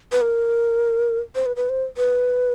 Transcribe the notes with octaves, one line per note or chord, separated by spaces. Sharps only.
B4
A#4
C5
B4
B4
C5
B4